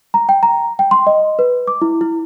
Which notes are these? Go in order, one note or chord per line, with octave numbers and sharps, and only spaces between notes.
A#5
G5
A#5
G5
C6
D#5
B4
D6
E4
E4